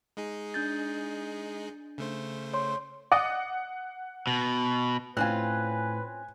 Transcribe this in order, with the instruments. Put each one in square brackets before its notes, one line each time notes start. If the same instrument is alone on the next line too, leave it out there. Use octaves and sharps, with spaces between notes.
[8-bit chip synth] G#3 D#4 G#4
[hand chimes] D4 G6 A6
[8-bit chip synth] C#3 A3 C5
[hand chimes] C#5 C6
[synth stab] D5 D#5 [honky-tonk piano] F#5
[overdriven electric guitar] B2
[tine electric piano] A2 [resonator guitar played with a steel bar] C4 C#4 F4 [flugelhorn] B4 [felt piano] G#5 F#6